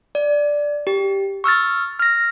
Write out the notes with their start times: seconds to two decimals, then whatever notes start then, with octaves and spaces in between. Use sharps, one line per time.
0.15 D5
0.87 G4
1.44 C#6 E6 F6 A6
1.99 F6 A#6